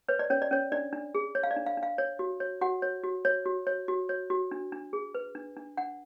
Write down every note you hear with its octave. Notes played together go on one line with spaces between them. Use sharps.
B4 C#5
D5
C#4 C#5
D5
C#4 C#5
D4 D5
D4
G#4
C#5
F5
D5
D4
F5
D4
F5
C#5
F#4
C#5
F#4 F#5
C#5
F#4
C#5
F#4
C#5
F#4
C#5
F#4
D4
D4
G#4
B4
D4
D4
D4 F#5